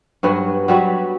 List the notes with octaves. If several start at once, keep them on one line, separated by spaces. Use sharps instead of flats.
G2 F#3 B3 F#4
F#3 G3 F#4 B4